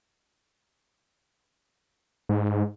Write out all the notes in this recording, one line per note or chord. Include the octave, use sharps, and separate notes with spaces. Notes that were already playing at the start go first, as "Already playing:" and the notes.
G#2